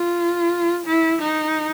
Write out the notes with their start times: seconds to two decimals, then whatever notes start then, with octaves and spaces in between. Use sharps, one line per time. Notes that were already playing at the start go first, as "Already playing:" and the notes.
Already playing: F4
0.86 E4
1.22 D#4